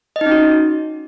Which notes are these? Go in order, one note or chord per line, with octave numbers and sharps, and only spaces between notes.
D#5
D#4
C#4
F#4